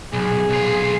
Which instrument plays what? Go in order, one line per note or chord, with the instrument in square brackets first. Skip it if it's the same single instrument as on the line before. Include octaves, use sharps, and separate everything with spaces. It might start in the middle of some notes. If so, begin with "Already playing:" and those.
[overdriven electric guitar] B1 [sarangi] G#4
[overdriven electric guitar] B1 F4